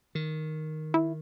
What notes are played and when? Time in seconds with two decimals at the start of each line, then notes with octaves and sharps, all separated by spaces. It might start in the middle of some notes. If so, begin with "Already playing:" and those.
0.15 D#3
0.94 E4